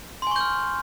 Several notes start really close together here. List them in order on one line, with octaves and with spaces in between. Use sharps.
C6 G#5 C#6 G6 F6